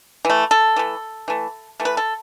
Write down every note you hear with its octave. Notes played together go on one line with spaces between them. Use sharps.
E3 A3
A4
E3 A3
E3 A3
E3 A3
B4
A4